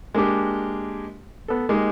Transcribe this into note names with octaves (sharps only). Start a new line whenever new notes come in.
G#3 A#3 D4 G4
B3 A4
G#3 A#3 D#4 G4